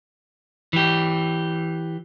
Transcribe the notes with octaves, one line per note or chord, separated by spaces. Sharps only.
E3 G4